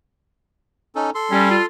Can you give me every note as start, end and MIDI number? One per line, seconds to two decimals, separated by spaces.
0.95 1.10 61
0.95 1.10 63
0.95 1.10 69
1.15 1.66 69
1.15 1.66 84
1.31 1.55 55
1.31 1.50 61
1.51 1.64 65